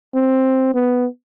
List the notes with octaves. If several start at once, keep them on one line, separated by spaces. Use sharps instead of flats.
C4
B3